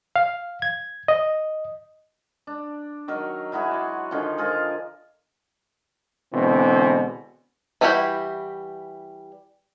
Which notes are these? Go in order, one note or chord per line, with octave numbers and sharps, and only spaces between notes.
F5
G#6
D#5
D4
D#3 F#3 A#4 C#6
F#3 E4 F#4 G#4
D5 C6
D3 D#3 F3 C#4
F4 G#4 A#4 C5
B2 D3 E3 G#3 C4
E3 G3 E4 F#4 G4